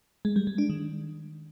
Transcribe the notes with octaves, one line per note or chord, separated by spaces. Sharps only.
G#3
G3
G#3
D4
D#3